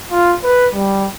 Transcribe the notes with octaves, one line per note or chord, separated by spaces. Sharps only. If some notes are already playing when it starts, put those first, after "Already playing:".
F4
B4
G3